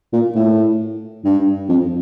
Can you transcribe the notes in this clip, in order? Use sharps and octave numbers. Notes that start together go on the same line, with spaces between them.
A#2
A2
G2
F2